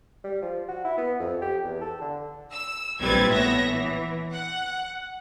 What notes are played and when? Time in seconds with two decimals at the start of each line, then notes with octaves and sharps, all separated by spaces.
0.24 G3
0.42 F3
0.69 F#4
0.84 E4
0.98 B3
1.20 F2
1.42 G4
1.64 E2
1.81 A4
2.01 D3
2.52 E6
3.00 A#1 G3 C4 B4 G#6 A6
3.30 A2 B3 C#5 E5 A#6
3.68 E3
4.31 F#5